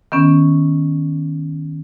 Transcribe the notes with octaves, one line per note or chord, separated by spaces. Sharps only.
D#3 B3 C#4